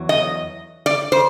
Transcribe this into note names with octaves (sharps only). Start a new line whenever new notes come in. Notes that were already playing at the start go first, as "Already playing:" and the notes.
Already playing: E2 F#3
D#5
D5
C5